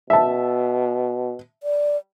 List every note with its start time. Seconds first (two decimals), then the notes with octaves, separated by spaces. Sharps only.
0.10 B2 E5 A5
1.63 D5